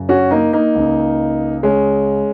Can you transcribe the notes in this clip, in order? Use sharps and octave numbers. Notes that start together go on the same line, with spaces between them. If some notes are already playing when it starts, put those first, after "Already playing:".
Already playing: F#2 C#3
C#4 F#4
A#3 D#4
A#3 D#4
C#2 C#3
G#3 C#4